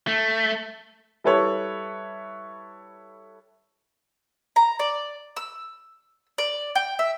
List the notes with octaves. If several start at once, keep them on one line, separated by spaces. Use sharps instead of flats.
A3
G3 E4 A4 B4 C#5
A#5
D5
E6
D5
G5
E5